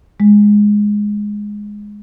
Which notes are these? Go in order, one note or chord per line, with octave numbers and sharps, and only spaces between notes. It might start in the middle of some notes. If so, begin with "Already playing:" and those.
G#3